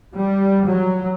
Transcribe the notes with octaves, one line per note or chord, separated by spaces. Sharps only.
G3
F#3